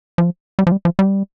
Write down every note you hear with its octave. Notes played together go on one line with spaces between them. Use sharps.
F3
G3
F3
G3
F3
G3